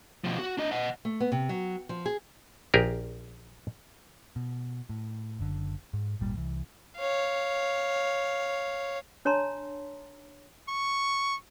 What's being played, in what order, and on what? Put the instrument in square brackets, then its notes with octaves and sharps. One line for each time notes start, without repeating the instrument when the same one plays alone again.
[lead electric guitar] B2 F3
F#4
D4 D#5
D#5 F#5
[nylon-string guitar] A3
B3
C3
F#3
F3
G#4
[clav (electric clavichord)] A#1 G4 G#4 A#4
[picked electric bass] B2
A2
F#1 D3
G#2
D#1 G#1 A#2 G3
C2 E3
[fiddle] C#5 F5
[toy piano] D4 C#5 A5 A#5 C6
[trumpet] C#6